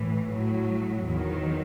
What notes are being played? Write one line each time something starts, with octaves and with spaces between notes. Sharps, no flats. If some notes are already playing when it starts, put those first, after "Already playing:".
Already playing: A2 E3
A2 F#3
E2 D#3 F#3